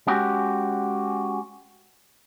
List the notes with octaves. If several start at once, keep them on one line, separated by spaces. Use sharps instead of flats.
G#3 C#4 F#4 G4